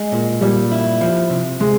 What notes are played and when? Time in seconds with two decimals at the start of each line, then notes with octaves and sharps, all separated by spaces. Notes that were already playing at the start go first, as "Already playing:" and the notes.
Already playing: G#3
0.12 A#2
0.41 A#2 G3
0.72 E4
1.01 F3
1.30 C3
1.60 C3 G#3